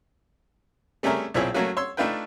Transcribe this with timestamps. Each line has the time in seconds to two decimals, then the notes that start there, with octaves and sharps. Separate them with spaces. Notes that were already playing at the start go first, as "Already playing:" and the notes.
1.03 G3 A3 C#4 G#4 A#4 E5
1.34 B1 A#2 C4 E4 G#4 C#5
1.54 F#3 A3 A#3 C#4 F#4
1.77 C#5 C6 E6
1.97 A3 D4 D#4 F4 B4 G5